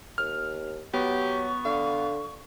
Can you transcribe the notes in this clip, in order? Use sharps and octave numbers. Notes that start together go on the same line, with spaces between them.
D#2 F6
F#3 B3 G4 C#6
D3 F5